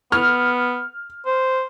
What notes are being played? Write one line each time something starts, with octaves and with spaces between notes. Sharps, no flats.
B3 F6
C5